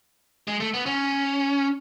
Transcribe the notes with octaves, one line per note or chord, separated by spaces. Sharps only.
G#3
A3
B3
C#4